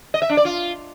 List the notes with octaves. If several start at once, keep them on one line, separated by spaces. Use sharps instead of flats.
D#5
E5
D4
D5
F4